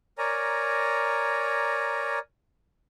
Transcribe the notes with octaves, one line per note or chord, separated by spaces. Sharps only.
A#4 C#5 D5 G#5 A#5